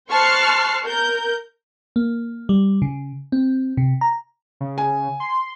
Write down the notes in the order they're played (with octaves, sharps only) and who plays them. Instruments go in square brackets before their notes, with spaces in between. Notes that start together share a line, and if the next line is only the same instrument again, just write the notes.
[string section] C5 A5 C#6 F6 F#6 C7
A#4 G6
[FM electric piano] A#3
G3
C#3
C4
C3
A#5
[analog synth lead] C#3
[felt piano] G#5
[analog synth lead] C6